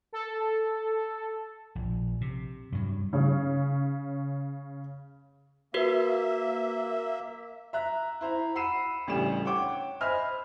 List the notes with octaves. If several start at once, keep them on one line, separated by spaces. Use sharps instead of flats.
A4
A#1
C3
G2 F#3
C#3 C#4
A#3 F#4 A#4 B4 E5
E5 A#5 F#6
E4 C5 A#5
F#5 B5 E6 C7 D#7 E7
A1 D2 C#3 G3 E7
C#5 F#5 G5 D6
C5 D#5 E5 G#5 B5 F6